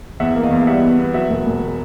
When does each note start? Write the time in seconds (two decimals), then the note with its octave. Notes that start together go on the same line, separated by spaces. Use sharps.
0.20 E2 E5 F#5
0.35 A#3
0.43 D#5 F5
0.51 E2
0.61 F5
0.67 G3 E5 F#5
0.82 B3
0.99 B3
1.14 F#3 E5 F#5
1.30 E1
1.46 E1